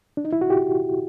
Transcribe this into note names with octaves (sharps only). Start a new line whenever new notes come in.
D4
D#4
E4
F#4
G4